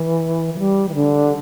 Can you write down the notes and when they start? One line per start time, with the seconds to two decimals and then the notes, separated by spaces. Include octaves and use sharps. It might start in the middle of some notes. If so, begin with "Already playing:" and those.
Already playing: E3
0.54 E3
0.59 G3
0.89 E3
0.95 D3